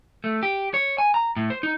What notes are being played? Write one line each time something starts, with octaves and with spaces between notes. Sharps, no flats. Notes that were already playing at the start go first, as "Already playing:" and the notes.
A3
G4
C#5
G#5
A#5
A2
C5
D#4